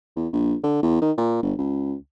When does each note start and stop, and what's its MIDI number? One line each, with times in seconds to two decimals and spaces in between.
0.16 0.28 40
0.33 0.55 34
0.64 0.79 50
0.83 1.01 40
1.02 1.12 51
1.18 1.40 46
1.43 1.54 31
1.59 1.95 37